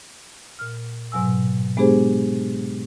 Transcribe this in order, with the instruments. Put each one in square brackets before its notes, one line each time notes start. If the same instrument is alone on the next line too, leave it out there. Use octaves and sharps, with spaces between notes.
[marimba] A#2 F6
G#2 B2 F#3 G#5 E6
G#3 B3 D4 G4 G#4 C5